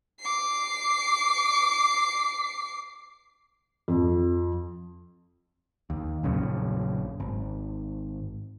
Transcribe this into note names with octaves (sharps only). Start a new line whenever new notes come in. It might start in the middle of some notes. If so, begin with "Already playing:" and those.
D6 C7
F2
D#2
A#1 F#2 C#3
G#1